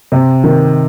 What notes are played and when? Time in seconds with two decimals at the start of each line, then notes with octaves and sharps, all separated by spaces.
0.12 C3
0.44 D#3